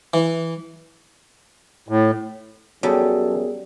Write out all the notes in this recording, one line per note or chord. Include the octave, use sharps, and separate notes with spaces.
E3
A2
F#2 F#3 G3 B3 G#4 A4